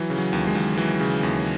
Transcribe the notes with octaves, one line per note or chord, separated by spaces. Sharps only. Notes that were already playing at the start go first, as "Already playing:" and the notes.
Already playing: E3 F#3
C#3
F#3
D#2
G#3
D#2
E3 F#3
C#3
D#2